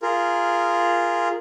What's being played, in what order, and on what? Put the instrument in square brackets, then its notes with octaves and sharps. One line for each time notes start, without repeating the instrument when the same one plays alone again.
[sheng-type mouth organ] F4 G#4 A#4